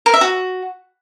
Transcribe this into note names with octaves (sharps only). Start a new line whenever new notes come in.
A#4
E5
F#4